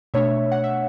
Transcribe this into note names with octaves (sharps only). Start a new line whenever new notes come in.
B2 A3 D4 C#5 E5
F#5
E5